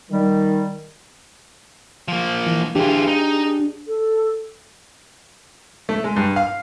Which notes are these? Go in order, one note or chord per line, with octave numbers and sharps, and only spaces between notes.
D#3 G3
F3 A#3
E3
E3 D4 F4 G4 G#4
D#4
A4
A3
G#3
G2
F5